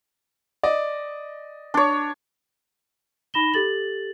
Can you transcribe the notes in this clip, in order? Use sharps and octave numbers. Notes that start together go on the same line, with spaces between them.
D5 D#5
D4 C#5
D#4 B5 A#6 E7 G7
G4 A4 A6 F#7